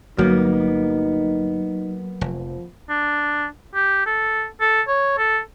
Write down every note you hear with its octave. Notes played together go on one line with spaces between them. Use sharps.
G1 F#3 A#3 B3 D#4
F1 F3
D4
G4
A4
A4
C#5
A4